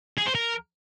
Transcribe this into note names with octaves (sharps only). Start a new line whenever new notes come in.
G#4
C5
A#4